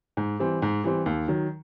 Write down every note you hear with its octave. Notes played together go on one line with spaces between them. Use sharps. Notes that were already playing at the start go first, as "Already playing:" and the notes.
G#2
E3 G3 C4
G#2
E3 G3 C4
D#2
D#3 F#3